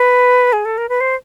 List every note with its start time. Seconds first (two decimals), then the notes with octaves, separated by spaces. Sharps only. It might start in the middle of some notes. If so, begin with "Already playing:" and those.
Already playing: B4
0.53 G#4
0.65 A4
0.78 A#4
0.89 B4
1.01 C5